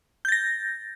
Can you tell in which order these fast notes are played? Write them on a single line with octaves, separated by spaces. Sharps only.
G6 A6 A#6